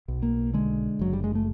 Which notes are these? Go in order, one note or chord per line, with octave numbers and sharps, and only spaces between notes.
B1
A#3
D3 G#3
F#1 F#3
G3
G#3
A3